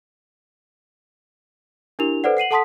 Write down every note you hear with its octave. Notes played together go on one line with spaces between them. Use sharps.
D4 E4 G4 A#4 F7
A4 B4 C5 D5 F#5
F#5 C7 D#7 F#7
A4 F#5 A5 C6 D#6 B6